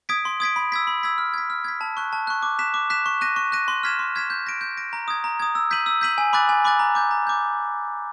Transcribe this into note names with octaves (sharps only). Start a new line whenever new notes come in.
D#6 G#6 B6 D7
C6
D#6 G#6 B6 D7
B5
E6 G#6 B6
B5
E6 G#6 B6
F6
G#6 B6
F6
G#6 B6
A5
C#6 F#6
A5
C#6 F#6
D6
F#6 B6 E7
D6
F#6 B6 E7
C#6
F#6 A#6 D#7
C#6
F#6 A#6 D#7
C6
F6 G#6 B6 E7
C6
F6 G#6 B6 E7
G6
A#6 D7
G6
A#6 D7
A#5
D#6 G#6
A#5
D#6 G#6
E6
G6 B6 D#7 F#7
E6
G6 B6 D#7 F#7
G#5
B5 D6 F#6 A6
G#5
B5 D6 F#6 A6
A#5
D6 G6
A#5
D6 G6